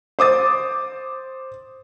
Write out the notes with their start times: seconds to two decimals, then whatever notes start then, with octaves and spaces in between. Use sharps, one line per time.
0.19 C5 D6 D#6 A6